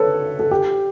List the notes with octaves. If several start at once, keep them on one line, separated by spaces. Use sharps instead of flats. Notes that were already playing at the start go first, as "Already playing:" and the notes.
Already playing: A4 B4 C#5
A4
G4